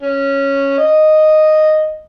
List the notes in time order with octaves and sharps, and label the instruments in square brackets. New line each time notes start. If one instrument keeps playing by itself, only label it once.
[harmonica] C#4
D#5